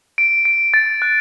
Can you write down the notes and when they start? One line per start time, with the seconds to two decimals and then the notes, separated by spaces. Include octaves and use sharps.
0.18 D7
0.45 D7
0.74 A6
1.02 F#6